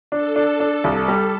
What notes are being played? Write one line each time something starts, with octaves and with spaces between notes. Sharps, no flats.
D4 A4
D4
D4
C2 A4
G3